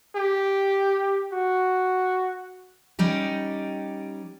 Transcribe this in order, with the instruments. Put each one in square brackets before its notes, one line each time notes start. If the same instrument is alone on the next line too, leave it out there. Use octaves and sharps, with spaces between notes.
[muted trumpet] G4
F#4
[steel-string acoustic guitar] G3 C#4 D#4 G4